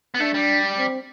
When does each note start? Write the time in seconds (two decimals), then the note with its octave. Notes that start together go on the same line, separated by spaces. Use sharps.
0.14 B3
0.20 A3 D4
0.34 G3
0.78 C4